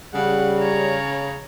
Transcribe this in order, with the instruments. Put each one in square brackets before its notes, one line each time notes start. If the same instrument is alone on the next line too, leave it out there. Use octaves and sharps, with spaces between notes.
[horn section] C#3 [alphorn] G3 [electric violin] F#5
[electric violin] C#5 A#5